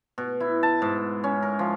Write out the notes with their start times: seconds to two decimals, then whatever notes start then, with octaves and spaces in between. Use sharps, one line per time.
0.18 B2
0.40 E4
0.63 A5
0.82 G#2
1.24 C#4
1.43 A#4
1.59 F3